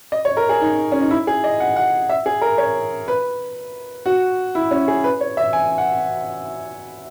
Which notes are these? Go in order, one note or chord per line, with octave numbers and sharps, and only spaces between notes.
D#5
C#5
A#4
G#4
D#4
C#4
D#4
E4
G#4
D#5
F#5
F#5
E5
G#4
A#4
C#5
B4
F#4
E4
C#4
G#4
B4
C#5
E5
G#5
F#5